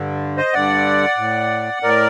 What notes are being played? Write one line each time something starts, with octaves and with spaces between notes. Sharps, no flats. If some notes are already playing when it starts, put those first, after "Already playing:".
Already playing: G2 D3
C5 D#5
G2 D3 D5 F#5
A2
A2 A#4 D5